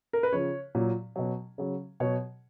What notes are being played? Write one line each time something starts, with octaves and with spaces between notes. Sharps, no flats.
A#4
B4
C#3 F3 C#5
A#2 F#3
B2 F#3
C#3 F#3
B2 F#3 C#5